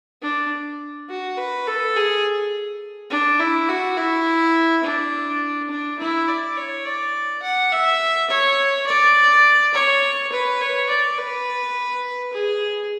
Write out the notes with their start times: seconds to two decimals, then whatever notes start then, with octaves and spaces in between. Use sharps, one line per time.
0.22 D4
1.09 F#4
1.37 B4
1.67 A4
1.96 G#4
3.10 D4
3.39 E4
3.68 F#4
3.97 E4
4.83 D4
5.70 D4
5.99 E4
6.28 D5
6.56 C#5
6.85 D5
7.43 F#5
7.72 E5
8.30 C#5
8.87 D5
9.74 C#5
10.32 B4
10.61 C#5
10.89 D5
11.18 B4
12.33 G#4